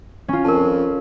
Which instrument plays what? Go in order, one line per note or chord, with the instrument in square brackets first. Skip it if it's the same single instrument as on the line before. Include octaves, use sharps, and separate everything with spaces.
[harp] C#4 F4
[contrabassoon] F2 [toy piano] A#4 A5